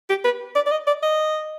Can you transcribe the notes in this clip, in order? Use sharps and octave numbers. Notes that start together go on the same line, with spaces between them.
G4
B4
D5
D5
D#5
D5
D#5